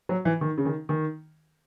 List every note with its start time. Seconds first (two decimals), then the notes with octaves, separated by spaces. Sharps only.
0.09 F#3
0.25 E3
0.41 D#3
0.58 C#3
0.65 D#3
0.89 D#3